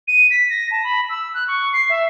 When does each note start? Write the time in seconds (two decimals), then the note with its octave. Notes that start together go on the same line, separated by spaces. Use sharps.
0.08 D#7
0.31 B6
0.50 A#6
0.71 A5
0.84 B5
1.10 E6
1.34 F#6
1.48 C#6
1.73 C7
1.90 E5